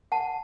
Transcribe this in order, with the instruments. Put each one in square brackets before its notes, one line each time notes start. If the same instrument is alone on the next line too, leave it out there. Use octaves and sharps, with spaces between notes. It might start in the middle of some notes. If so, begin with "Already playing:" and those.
[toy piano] F#5 A5